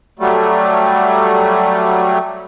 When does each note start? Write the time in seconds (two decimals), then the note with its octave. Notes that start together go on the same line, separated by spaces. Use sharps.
0.19 F#3 G3 A3